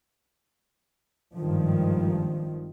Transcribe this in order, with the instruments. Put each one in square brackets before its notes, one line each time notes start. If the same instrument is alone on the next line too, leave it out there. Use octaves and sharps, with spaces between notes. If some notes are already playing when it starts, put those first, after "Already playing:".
[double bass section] G#1 G2 D#3 F3